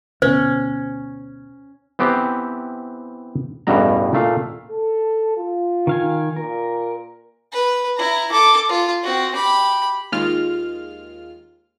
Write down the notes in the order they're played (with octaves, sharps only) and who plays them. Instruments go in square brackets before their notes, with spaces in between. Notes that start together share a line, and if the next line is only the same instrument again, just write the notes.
[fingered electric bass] D2 B2 [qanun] C#4 [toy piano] C5
[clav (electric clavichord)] E3 B3 C4 G4
A1 E2 G2 B2 A#5
A#2 A3 F5
[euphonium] A4
F4
[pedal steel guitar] D#3 F5 G#5
[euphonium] A#2 [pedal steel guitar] A#4
[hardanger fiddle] B4
E4 A#5
A4 D6
F4
C4 F#4
G4 B5
[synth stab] D#2 G#3 F4 F6